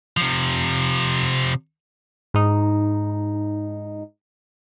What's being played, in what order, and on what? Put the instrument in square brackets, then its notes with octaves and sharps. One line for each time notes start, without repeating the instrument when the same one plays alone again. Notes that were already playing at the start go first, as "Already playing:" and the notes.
[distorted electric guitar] C3 F3
[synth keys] G#2 D#4